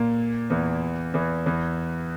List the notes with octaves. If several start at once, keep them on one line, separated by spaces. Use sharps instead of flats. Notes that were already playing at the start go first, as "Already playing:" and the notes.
Already playing: A#2 A#3
E2 E3
E2 E3
E2 E3